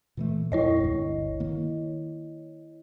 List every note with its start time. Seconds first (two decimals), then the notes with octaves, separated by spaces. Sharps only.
0.17 A#2 E3 A3
0.52 F2 A#2 G#3 E4 C#5 D#5
0.80 G1 D2
1.40 D#3 A#3